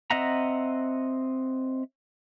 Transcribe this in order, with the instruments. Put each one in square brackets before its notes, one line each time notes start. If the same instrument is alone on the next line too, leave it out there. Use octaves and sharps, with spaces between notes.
[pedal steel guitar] C4 D#5 E5 F#5 A#5